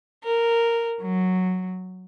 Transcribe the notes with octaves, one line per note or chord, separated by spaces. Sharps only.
A#4
F#3